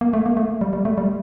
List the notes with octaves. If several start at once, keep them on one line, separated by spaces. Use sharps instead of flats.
A#3
A3
A#3
A3
G3
G3
A3
G3